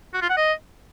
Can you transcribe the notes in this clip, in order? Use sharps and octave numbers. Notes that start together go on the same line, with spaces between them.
F#4
F4
F#5
D#5